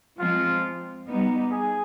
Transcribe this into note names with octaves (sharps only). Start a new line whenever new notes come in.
F3 G#3 C4 F4
G3 B3 D#4
G#4